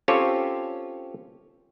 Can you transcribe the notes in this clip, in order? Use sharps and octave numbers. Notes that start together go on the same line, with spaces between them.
C4 C#4 F4 G4 A4 C#5